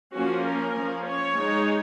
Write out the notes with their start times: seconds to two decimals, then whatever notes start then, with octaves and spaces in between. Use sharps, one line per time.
0.15 F3 A#3 C#4 F#4
0.45 A#4
0.76 F3 A#3 C#4
1.06 C#5
1.37 G#3 D#4